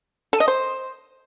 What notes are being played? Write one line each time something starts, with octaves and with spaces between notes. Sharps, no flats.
A4
D#5
C5